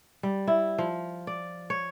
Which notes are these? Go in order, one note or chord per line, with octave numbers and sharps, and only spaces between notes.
G3
E4
F3
D5
C#5